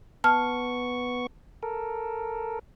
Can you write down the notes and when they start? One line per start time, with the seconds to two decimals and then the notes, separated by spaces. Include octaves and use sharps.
0.24 B3 A5 C#6 F6
1.63 A4 A#4